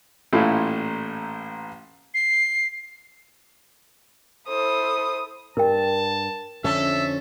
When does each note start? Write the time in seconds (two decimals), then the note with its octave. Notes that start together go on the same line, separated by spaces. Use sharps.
0.33 A1 A#2 A3 E4 F5
2.14 C7
4.48 E4 A4 C5 D#6
5.57 G2 A#4 G5 A5
6.64 F2 D3 C#4 A4 E5